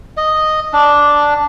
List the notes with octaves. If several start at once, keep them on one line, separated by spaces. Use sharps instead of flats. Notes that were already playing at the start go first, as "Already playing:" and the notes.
D#5
D4